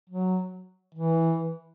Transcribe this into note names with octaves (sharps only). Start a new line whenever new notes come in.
F#3
E3